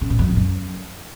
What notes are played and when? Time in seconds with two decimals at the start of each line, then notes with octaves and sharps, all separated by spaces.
0.01 C#3
0.10 G#2
0.19 F2
0.28 A2
0.36 F#2